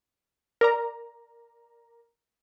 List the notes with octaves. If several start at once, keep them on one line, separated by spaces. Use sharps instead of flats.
A#4 D5 A#5